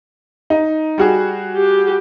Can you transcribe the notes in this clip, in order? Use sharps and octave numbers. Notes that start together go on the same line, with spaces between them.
D#4
G3 F#4 G#4
G4